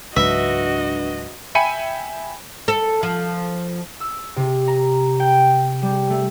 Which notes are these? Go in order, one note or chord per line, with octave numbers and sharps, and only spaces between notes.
C#2 G#2 F#3 D4 F#4 B4 D#5 E5
E5 G5 G#5 B5 C#7 D#7
A4
F3
E6
C3
A#5
G5
G3
A3